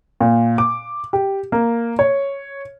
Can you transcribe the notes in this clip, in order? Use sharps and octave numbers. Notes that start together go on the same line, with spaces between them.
A#2
D6
G4
A#3
C#5